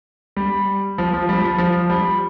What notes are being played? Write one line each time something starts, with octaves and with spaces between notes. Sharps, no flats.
G3
F3
F3
G3
F3
F3
G3